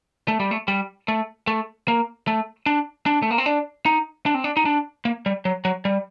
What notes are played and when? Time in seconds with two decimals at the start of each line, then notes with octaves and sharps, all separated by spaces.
0.28 A3
0.40 G3
0.51 A3
0.68 G3
1.08 A3
1.47 A3
1.88 A#3
2.27 A3
2.66 D4
3.06 D4
3.22 A3
3.31 A#3
3.38 C4
3.46 D4
3.86 D#4
4.26 D4
4.34 C4
4.44 D4
4.57 D#4
4.65 D4
5.05 A#3
5.26 G3
5.45 F#3
5.65 F#3
5.85 G3